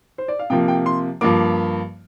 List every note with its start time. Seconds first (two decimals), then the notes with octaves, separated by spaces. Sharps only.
0.18 C5
0.28 D5
0.39 F5
0.50 C3 F3 A#3 G5
0.68 G5
0.86 C6
1.21 G2 F3 A#3 D6